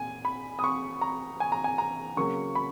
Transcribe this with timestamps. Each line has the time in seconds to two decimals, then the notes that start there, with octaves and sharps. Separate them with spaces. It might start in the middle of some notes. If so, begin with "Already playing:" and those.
Already playing: A#2 G#5
0.25 B5
0.59 D#6
0.64 C#6
1.01 A#5
1.40 G#5
1.52 A#5
1.64 G#5
1.78 A#5
2.17 C#3 F#3 A#3 C#6
2.55 B5